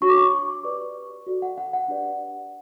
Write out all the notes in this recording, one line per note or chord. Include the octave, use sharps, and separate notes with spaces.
D4 F#4 C#5 C#6
D6
C#6
G4 B4 D5
F#4 A4 D5
F#5
F#5
F#5
D4 G4 B4 D5